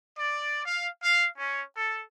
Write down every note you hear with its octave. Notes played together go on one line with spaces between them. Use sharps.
D5
F5
F5
C#4
A4